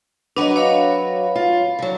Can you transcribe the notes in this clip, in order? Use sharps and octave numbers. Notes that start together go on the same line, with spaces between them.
F#3 D4 F#4 B4 D#5
C#5 F5 B5
F4
D3 F#3